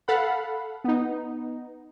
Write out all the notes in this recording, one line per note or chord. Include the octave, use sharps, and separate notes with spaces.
A4 F5 F#5 B5
B3 D#4